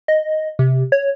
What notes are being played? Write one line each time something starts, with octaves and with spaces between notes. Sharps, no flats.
D#5
C3
C#5